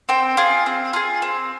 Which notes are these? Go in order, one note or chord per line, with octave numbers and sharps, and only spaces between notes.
C4 G5
F4 G#4
C4
F4 G#4
C4